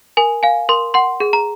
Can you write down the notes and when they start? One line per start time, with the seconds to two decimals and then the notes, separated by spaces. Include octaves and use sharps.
0.17 A#4 G#5
0.43 F5 G#5
0.69 A#4 C6
0.94 F#5 C6
1.20 G#4
1.33 A#5